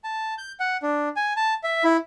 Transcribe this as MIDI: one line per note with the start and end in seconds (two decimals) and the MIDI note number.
0.04 0.34 81
0.38 0.52 91
0.60 0.77 78
0.83 1.09 62
1.16 1.33 80
1.36 1.54 81
1.63 1.84 76
1.84 1.97 64